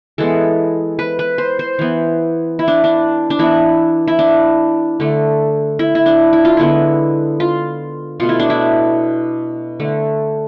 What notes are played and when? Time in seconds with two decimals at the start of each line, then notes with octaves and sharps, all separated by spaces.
0.18 E3 G#3 B3 A4
0.99 B4
1.19 B4
1.38 C5
1.59 C5
1.79 E3 B3
2.59 E4
2.68 D4
2.84 D4
3.30 D4
3.39 E3 B3 E4
4.07 E4
4.19 D4
5.00 D3 A3
5.79 E4
5.95 E4
6.06 D4
6.33 E4
6.45 F4
6.57 D3 G#3 B3 E4
7.40 F4
8.20 B2 A3 F4
8.29 E4
8.39 D4
8.50 E4
9.80 D3 A3